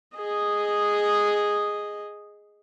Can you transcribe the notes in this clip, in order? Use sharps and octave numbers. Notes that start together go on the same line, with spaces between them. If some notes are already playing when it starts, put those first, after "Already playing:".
G#4 D#5